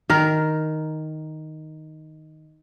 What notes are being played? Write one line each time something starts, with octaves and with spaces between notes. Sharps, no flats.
D#3 A#4